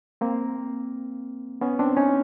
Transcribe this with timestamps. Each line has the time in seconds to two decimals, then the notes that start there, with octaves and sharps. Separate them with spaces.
0.21 A#3 C4
1.61 B3 C#4
1.79 C4 D4
1.96 C#4 D#4